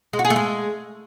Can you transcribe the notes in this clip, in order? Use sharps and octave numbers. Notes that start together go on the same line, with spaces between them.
G#3
F#4
G#4
A3
G#3